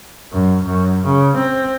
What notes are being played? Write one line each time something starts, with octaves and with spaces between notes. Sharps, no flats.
F#2
F#2
C#3
C4